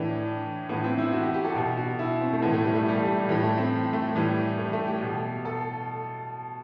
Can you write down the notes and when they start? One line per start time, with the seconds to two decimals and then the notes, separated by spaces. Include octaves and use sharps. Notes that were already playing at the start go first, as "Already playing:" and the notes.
Already playing: A2 E3 D4
0.69 A2 B3
0.74 E3
0.84 C4
0.98 E4
1.12 F#4
1.23 G4
1.34 G4
1.45 A4
1.56 B2
1.77 F#4
1.99 E4
2.21 C4
2.33 A3
2.42 A2 E3 B3
2.54 A3
2.64 G3
2.75 A3
2.88 G3
2.96 A3
3.07 A3
3.18 G3
3.29 A2 E3 A3
3.43 A3
3.58 C4
3.93 A3
4.15 A2 E3 G3
4.58 A3
4.73 A3
4.88 G4
5.02 B2
5.45 A4